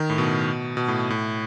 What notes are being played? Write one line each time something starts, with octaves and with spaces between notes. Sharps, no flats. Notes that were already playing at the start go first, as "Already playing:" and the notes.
Already playing: D#3
A2
B2
B2
A2
A2